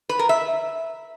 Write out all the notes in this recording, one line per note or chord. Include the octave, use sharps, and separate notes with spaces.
B4
A#4
E5